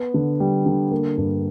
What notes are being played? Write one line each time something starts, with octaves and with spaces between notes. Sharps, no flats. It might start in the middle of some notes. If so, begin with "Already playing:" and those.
Already playing: B3
D3
G3
D3
A#3
G2